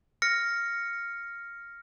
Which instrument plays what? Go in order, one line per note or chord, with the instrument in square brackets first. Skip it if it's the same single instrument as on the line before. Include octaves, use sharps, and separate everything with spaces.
[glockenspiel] F6 A#6 C#7